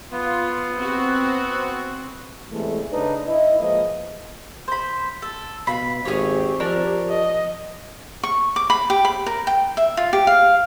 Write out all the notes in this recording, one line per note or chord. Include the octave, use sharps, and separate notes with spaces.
B3 F4
C4 F#4
E2 C3 E3 G#3 A3
C#3 D4 D#4 B4
E4 D#5
F3 G#3 A#3 B4 D#5
C5 B5
A4
B2 F5 B5
G#1 C4 G4 G#4 C#5
F3 D4 A#4 C#5
D#5
C#6
D6
B5
G4
B5
A#4
G5
E5
F4
G4
F5